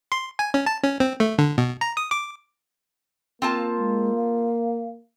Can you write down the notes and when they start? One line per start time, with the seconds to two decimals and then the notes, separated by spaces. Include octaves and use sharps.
0.12 C6
0.39 G#5
0.54 C#4
0.66 A5
0.83 C#4
1.00 C4
1.20 A3
1.39 D3
1.58 B2
1.81 A#5
1.97 D#6
2.11 D6
3.42 A#3 C4 F4 A5
3.78 G#3
4.15 F5